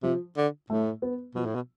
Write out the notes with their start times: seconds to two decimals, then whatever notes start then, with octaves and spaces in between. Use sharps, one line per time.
0.03 C3 F3
0.37 D3
0.70 A2 A3
1.02 B3
1.35 B2 F3
1.45 A2
1.55 B2